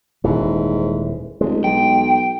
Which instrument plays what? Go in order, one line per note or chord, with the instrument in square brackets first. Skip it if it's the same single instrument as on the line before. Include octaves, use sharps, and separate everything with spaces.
[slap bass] D#1 E3 [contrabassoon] G#2
[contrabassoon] D1 [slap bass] G#3
[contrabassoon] B1 [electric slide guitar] G5